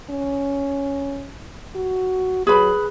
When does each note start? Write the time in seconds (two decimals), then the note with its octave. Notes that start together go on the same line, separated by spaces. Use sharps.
0.10 C#4
1.76 F#4
2.47 F#3 G#4 B4 B5